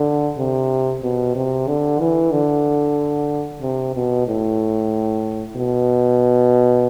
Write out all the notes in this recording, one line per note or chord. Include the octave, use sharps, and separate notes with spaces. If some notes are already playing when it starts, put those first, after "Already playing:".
Already playing: D3
C3
B2
C3
D3
E3
D3
C3
B2
A2
B2